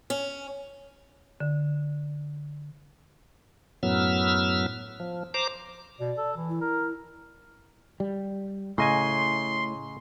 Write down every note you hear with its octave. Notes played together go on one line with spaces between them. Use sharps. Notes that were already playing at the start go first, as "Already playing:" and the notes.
C#4
D3
F#2 A2 F#3 B3 E6 F6
F3
C5 A#5 D6
B2 D5
A4
E3
E4
A#4
G3
A2 C#3 D#5 G#5 C6